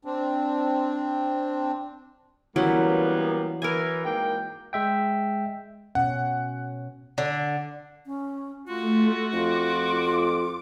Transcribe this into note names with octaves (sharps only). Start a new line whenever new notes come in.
C4 D4
E3 F#3 G3 A#3 B3 C#4
E3 A#4 G#5
G#2 A#3 G5
G#3 E5 G5
B2 C#4 F#5
D3
C#4
A3 F4 F#4
F2 F4 D6